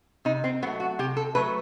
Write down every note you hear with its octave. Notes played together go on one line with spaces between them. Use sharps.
C3 D#4
C4
F#3 A3 B3
F#4
C3 G4
A4
F#3 A3 B4